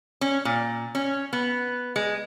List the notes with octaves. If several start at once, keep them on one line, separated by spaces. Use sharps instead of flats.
C#4
A#2
C#4
B3
G#3